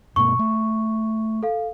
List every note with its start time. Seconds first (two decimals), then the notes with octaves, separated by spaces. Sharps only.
0.16 G2 B2 A#3 C#6
0.39 A3
1.43 A4 F5